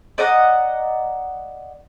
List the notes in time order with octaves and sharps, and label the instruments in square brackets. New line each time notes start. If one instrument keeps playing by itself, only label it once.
[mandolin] D5 D#5 F#5 A#5